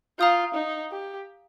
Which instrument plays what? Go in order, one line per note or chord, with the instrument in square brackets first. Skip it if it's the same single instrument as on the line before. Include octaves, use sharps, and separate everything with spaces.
[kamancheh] F4 [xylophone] F5 A#5 D#6 G6
[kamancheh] D#4
G4